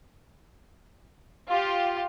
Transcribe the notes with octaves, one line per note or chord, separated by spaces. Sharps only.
F4 G4